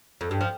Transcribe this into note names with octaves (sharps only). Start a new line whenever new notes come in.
F2
G2
F3